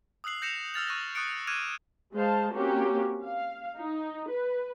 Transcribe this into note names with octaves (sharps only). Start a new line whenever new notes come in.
D#6 E6 F#6 C7 F#7
G6 A#6 C#7 E7 F7
E6 F6 A6 F7
C#6 F#6 A#6
C#6 D#6 F#6 A6 C#7 D7
D6 F6 F#6 G#6 D#7 E7
G#3 C5 F5 A5
A#3 C4 C#4 F#4 G4
F5
D#4
B4